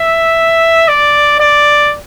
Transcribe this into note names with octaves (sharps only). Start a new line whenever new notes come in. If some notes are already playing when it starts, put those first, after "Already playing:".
Already playing: E5
D5
D5